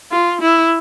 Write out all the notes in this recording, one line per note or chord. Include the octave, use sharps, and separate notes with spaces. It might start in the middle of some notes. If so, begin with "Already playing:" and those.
F4
E4